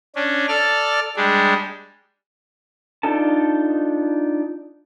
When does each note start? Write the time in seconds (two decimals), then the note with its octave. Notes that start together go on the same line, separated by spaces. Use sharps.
0.16 C#4 D4
0.48 A4 D5 F6
1.16 G3 G#3 D4
3.03 D4 D#4 F4 A4 A5